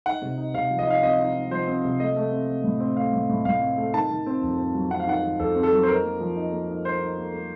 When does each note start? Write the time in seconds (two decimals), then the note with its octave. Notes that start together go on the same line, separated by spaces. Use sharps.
0.06 D#4 F#5
0.22 C3
0.38 D#4
0.54 C3 F5
0.71 F3
0.79 D#5
0.87 D#4 F5
1.03 C4 D#5
1.19 D#4
1.35 D#4
1.51 F3 C5
1.67 C4
1.84 C3
2.00 A3 D#5
2.16 A3
2.32 C4
2.48 C4
2.64 A2
2.80 C4
2.97 A3 F5
3.13 A2
3.29 A2
3.45 A2 F5
3.61 C4
3.78 A3
3.94 D#3 A5
4.10 D#3
4.26 C4
4.43 F2
4.58 C4
4.75 F#3
4.91 C4 F#5
5.00 F5
5.07 D#3 F#5
5.24 D#3
5.40 F2 A4
5.55 C4
5.63 A4
5.72 F#3
5.83 C5
5.88 D#4 A#4
6.04 A#3
6.20 F3
6.36 D#4
6.52 A#3
6.69 D#4
6.85 D#4 C5
7.01 D#4
7.18 A#3
7.33 A#3